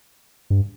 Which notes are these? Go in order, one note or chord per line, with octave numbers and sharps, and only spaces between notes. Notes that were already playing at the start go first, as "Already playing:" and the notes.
G2